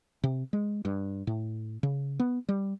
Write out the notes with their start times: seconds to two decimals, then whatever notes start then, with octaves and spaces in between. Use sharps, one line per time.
0.24 C3
0.53 G#3
0.85 G2
1.27 A2
1.83 C#3
2.20 B3
2.49 G3